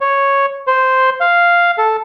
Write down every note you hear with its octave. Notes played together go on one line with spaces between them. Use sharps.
C#5
C5
F5
A4